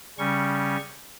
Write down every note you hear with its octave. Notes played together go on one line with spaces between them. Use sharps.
C#3 G3 C#4 C#6
C#6